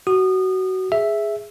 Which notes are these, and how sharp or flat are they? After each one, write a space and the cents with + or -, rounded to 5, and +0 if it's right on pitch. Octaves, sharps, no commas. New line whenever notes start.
F#4 +20 D#6 -30
G#4 +0 E5 +0